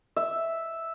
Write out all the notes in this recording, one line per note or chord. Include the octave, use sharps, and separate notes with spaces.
E5